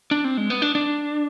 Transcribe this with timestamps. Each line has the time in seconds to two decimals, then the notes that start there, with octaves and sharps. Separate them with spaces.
0.11 D4
0.24 C4
0.37 G#3
0.50 B3
0.62 D4
0.75 D4